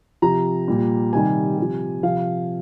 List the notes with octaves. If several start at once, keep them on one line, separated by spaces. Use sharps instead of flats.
C3 F3 A#5
A#2 G3
C3 D#3 G3 G#5
C3 F3
C3 F3 F5